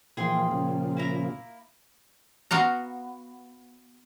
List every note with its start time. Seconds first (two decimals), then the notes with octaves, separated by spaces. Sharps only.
0.17 A#2 E3 F3 G#4 G5 C6
0.51 A#2 C#3 F3
0.97 A#3 E4 A#5
2.51 B3 F#4 F5 A#5